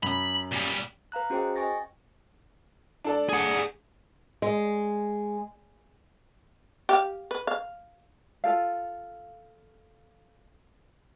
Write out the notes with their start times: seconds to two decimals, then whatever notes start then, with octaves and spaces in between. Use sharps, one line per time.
0.03 F#2 B5
0.52 A#2 G3
1.12 B4 F5 A#5 F#6
1.30 C#4 F#4 G#4 C5 D#5 G5
1.56 D#5 G5 G#5 C#6 A6 A#6
3.04 D4 A4 D5
3.29 G#4 F#5
4.42 G#3
6.89 G4 F5
7.31 B4
7.47 F5
8.44 F4 A4 F5